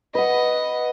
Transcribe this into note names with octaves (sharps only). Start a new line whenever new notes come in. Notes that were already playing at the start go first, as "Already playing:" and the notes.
B4 D#5 F#5